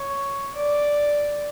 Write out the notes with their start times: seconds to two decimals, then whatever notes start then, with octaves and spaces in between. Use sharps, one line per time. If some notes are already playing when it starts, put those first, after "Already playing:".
Already playing: C#5
0.55 D5